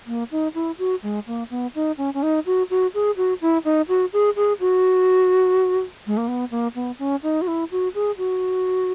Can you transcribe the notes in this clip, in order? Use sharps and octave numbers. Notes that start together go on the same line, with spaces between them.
A#3
D#4
E4
F#4
G#3
A#3
B3
D#4
C#4
C#4
D#4
F#4
F#4
G#4
F#4
E4
D#4
F#4
G#4
G#4
F#4
G#3
A#3
B3
A#3
B3
C#4
D#4
F#4
E4
F#4
G#4
F#4